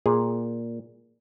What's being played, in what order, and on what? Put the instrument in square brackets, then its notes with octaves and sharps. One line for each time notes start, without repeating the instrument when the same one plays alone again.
[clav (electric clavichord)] A#2 [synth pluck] G#4